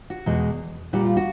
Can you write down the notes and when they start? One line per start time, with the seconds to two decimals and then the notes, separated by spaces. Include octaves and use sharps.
0.10 F#4
0.26 E2 B2 G#3
0.93 A#2 G3 F#4
1.05 F4
1.17 F#4